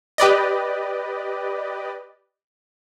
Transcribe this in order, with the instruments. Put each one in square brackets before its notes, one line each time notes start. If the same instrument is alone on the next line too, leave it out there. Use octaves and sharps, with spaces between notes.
[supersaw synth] G4 B4 D5 D#5